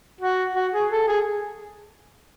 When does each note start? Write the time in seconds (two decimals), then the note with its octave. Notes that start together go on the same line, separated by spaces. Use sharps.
0.21 F#4
0.56 F#4
0.74 G#4
0.91 A4
1.08 G#4